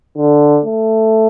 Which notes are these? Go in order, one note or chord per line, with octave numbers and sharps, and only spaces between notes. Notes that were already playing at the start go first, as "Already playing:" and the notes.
D3
A3